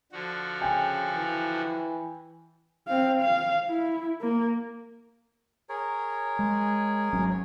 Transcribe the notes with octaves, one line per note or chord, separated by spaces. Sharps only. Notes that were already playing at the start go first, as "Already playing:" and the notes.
D3 F3 F#4
C#3 G5 G#5
E3
C4 F5
F5
E4
A#3
G#4 A#4 C#5
G#3
G#1 F#3 C#4
C#5